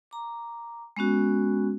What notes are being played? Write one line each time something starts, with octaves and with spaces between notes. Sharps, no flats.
A#5 D6
G#3 B3 C#4 F#4